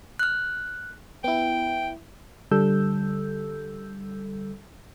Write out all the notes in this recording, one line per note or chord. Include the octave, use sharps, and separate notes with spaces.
F6 F#6
B3 E4 G5
D3 G3 A4 E6 G6